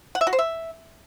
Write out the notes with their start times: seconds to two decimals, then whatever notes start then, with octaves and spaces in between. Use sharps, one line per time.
0.15 F#5
0.21 E5
0.27 F#4
0.33 C5
0.39 E5